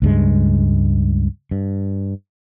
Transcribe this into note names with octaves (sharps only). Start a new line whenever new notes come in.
C#2 G2 G#3
G2